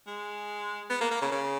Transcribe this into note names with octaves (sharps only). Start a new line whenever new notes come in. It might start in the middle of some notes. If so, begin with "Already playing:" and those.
G#3
B3
A#3
A#3
C#3
C#3